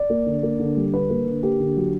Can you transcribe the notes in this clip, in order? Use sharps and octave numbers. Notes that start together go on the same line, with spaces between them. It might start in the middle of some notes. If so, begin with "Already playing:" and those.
Already playing: D5
A#3
D3
A#3
D3
G3
D3 B4
A#3
D3
A#3 G4
D3
F#3